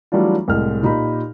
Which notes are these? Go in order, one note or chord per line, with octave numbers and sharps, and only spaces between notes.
E3 F#3 G3 A3 D4 F4
C2 A2 G#3 F6
A#2 D#4 G4 B5